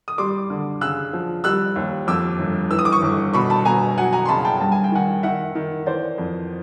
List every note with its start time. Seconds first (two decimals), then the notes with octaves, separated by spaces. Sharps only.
0.08 D#6
0.18 G3 C6 D6
0.50 D3
0.81 C#3 E6 F#6
1.13 F3
1.44 G3 E6 F#6
1.76 D#2
2.07 F2 D6 E6
2.39 G1
2.71 E3 E6
2.79 D#6
2.85 D6
2.92 C#6 D#6
3.02 G1
3.33 B2 B5 C#6
3.50 A5 B5
3.65 B2 G#5 A#5
3.97 F#3 F#5 G#5
4.13 G#5 A#5
4.25 C6
4.28 C#3 A5 B5
4.45 G5 A5
4.60 G2 A5
4.72 G#5
4.84 G5
4.92 D#3 F#5 G#5
5.23 D#3 E5 F#5
5.55 D#3
5.86 E3 C5 D5
6.18 F2